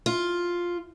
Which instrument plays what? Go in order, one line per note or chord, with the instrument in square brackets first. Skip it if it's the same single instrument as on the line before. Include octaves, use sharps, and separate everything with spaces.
[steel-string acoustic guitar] F4